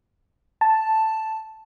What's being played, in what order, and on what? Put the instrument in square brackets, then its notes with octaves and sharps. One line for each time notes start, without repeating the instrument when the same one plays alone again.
[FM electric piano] A5